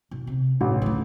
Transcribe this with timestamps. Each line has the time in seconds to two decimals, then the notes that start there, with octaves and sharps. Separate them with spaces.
0.11 B2
0.27 C3
0.61 A1 D3
0.82 D2 C#3